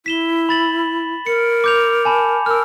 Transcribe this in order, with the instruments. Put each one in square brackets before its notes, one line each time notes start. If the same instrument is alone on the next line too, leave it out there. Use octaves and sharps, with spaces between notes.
[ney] E4 [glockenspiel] B6 E7 G7
[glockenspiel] B5 A6 F#7
[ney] A#4 [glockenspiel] C#7
[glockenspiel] D6 G6 F7
G#5 A5 B5
[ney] A#4 [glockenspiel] E6 F6